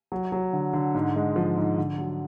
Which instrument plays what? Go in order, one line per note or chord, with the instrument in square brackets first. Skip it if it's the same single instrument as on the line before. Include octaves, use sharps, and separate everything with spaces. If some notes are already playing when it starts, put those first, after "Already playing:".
[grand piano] F#3
F#3
D3
D3
G#2
G#3
F3
G#2
D3
F#3